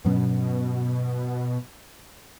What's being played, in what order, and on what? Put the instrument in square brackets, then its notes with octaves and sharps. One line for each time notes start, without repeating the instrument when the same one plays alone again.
[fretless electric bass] G2 F#3 C#4 [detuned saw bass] B2